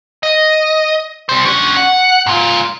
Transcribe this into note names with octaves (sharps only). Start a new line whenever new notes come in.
D#5
G3 C5
C#4 D4
F#5
G#2 F4